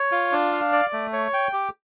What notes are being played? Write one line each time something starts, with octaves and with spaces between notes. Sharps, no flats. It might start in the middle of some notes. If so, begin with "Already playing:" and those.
Already playing: C#5
F4
D4
F5
D5
A3
C#5
G5
G4